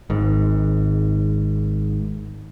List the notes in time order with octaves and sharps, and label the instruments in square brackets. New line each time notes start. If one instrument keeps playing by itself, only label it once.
[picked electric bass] G#1 G#2